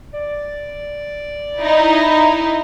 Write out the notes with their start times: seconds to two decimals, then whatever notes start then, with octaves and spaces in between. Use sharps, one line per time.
0.13 D5
1.61 D#4 E4